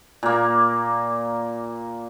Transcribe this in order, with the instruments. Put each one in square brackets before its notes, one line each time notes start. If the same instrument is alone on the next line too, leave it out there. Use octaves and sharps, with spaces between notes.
[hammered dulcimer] A#2 A#3